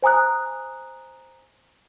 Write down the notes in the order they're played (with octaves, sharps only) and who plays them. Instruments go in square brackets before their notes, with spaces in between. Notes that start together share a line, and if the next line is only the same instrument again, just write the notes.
[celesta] C5 G#5 A#5 D#6 F#6